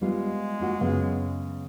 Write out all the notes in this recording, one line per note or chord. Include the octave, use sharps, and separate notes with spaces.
G3 G#3 B3 F4
A#3 F4 F#4
F#2 C#3 B3